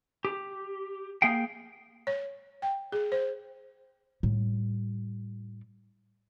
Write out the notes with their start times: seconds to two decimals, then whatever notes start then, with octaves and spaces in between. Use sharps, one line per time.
0.25 G4
1.22 A#3 G#4 F5 G5
2.07 C#5
2.62 G5
2.92 G#4
3.12 C5
4.23 A2 G3